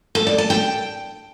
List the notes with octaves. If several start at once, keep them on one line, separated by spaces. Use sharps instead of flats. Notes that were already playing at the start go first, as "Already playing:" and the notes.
A4
D5
A5
G5